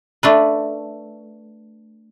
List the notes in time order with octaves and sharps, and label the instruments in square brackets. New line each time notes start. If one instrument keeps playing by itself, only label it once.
[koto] A3 D4 B4